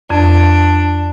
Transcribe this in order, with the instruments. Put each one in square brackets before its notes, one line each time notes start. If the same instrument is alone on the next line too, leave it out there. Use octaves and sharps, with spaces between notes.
[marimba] F2 [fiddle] D4